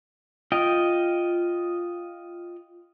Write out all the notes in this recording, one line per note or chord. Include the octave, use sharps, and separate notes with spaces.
F4 D#5 G5